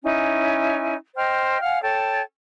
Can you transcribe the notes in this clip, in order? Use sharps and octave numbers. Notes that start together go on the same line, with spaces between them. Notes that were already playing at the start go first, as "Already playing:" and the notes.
C#4 D#4 E4 G#5
C5 D#5 G5 F6
F5 F#5 G#5 F6
A4 C#5 G5 A5